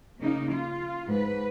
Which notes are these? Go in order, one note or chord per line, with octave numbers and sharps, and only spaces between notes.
C#3 A#3 D#4
F4
G#2 B4